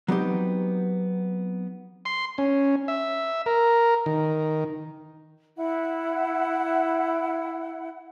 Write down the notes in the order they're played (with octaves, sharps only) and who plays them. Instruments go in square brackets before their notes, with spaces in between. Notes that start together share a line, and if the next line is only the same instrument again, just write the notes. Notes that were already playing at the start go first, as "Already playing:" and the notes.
[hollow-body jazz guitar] F#3 B3 C4 D#4 G4
[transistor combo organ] C6
C#4
E5
A#4
D#3
[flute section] E4 F#5